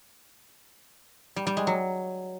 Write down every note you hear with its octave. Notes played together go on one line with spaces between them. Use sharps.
G3
G3
G#3
F#3